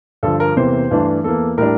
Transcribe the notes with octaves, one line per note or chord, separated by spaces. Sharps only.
G2 D3 F3 A4
A#4
E2 C3 E3 A#3 C5
G2 E3 A3 D4
E2 E3 A#3 A4
A2 G3 D4 A#4